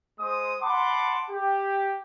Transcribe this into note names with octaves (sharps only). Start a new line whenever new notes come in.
G#3 C5 D#6
F#5 A5 B5 C6 D6
G4